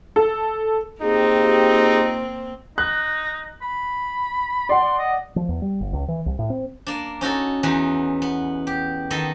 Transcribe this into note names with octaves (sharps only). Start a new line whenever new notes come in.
A4
A#3 C4 D#4 F4 G4 G#4
D#4 F#6
B5
D5 F#5 C6
D#5
F3
E2
G3
G1
C#2
E3
C2
A2
C4
A#3 D4
C#4 D#4 F#4 A4
E2 E3 C#4 D#4 B4
B3
G4
D#3 B3 A4 D#5